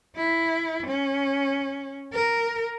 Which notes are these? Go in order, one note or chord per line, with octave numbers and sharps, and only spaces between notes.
E4
C#4
A#4